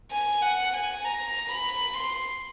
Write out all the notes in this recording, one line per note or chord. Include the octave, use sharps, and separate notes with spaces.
G#5
F#5
G#5
A#5
B5
C6